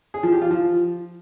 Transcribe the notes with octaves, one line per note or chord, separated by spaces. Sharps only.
G#4
F3
G4
F4
F3